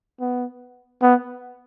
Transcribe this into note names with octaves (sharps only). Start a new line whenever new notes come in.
B3
B3